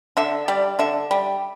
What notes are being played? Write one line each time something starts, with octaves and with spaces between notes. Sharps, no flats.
D3 E5
G3 D5
D3 E5
G3